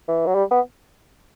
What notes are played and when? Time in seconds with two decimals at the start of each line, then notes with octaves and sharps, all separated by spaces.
0.08 E3
0.26 F#3
0.35 G3
0.51 B3